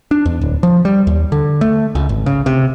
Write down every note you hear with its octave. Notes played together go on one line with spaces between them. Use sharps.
D4
E2
D1
F3
G3
D#2
D3
A3
C#2
G#1
C#3
C3